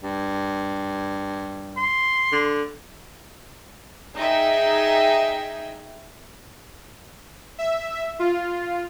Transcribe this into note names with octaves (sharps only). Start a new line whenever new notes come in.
G2
C6
D3
D#4 G#4 D#5 E5 G5
E5
F4